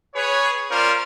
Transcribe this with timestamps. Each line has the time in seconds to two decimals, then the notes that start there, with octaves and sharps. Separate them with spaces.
0.15 G#4 B4 C#5
0.70 C#4 F4 A#4 C5 D5